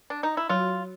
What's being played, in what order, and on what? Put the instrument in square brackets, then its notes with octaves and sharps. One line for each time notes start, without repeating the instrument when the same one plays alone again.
[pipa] D4
D#4
E4
[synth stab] F#3 [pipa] F4